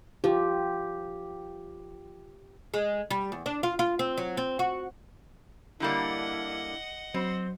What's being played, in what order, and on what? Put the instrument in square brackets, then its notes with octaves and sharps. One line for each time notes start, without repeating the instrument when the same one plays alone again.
[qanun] F3 [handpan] G4
[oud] G#3
G3
E2
D4
F4
F4
C4
F#3
C4
F#4
[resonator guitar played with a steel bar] D3 G3 A#3 [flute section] D4 E4 [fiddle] D#5 F#5
[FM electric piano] F#3 [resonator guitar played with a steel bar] C4 [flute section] C5